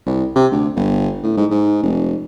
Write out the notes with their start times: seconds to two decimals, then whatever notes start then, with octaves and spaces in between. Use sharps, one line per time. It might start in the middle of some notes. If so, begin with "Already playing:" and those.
0.06 C2
0.36 C3
0.52 D2
0.76 G1
1.23 A2
1.37 G#2
1.51 G#2
1.83 F1